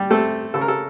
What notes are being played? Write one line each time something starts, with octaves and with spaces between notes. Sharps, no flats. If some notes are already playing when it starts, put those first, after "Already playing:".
Already playing: G3 G4
A3 C4 A4
C#3 A4
A#4
A4